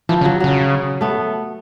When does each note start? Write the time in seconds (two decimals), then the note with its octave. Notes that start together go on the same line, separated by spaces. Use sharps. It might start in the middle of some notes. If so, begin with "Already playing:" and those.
0.09 E3 F3
0.21 C#3
0.25 F#3
0.40 C#3 F#3
1.01 A3 B3